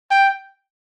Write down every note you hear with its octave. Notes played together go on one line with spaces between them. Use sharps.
G5